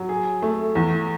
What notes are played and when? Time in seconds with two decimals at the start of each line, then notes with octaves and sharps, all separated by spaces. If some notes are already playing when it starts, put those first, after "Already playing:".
Already playing: F#3
0.09 G#4
0.42 A3
0.75 E2